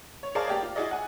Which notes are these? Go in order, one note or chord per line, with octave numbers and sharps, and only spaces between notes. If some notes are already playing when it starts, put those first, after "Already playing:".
C#5
G#4 A#4 C5 D5 F5 A5
A#3 G4 D5
F4
E4 F#4 G#4 D5 D#5
F#5 G#5